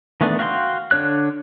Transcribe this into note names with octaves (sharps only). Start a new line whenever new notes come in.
D#3 E3 A3 B3 D4
F#4 F5 G5 A5 C6
D3 D4 C#5 F#6